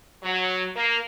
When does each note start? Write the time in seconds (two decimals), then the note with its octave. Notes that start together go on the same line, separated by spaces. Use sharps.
0.24 F#3
0.76 A#3